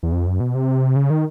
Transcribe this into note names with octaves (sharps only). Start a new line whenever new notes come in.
E2
F2
F#2
B2
C3
C#3
D#3